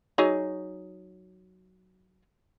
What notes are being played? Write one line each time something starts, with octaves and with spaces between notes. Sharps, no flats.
F#3 D#4 G#4